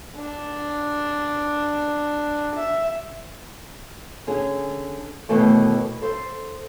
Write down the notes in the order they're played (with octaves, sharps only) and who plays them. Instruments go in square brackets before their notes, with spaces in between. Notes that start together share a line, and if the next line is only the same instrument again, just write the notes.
[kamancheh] D4
E5
[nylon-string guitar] D3 C#4 G#4
D#2 B2 E3 A3
A4 C5